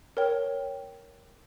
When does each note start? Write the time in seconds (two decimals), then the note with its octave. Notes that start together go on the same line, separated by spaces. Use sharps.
0.17 A#4 C#5 G5